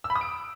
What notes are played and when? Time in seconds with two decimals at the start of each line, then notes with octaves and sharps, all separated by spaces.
0.04 E6
0.10 B5
0.15 D#6
0.21 D7